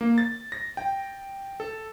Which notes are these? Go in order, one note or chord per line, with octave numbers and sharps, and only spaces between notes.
A#3
A6
A#6
G5
A4